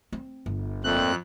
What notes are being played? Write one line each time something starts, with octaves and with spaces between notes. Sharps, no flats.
C4
G1
F2 A#2 A3 C4 F#6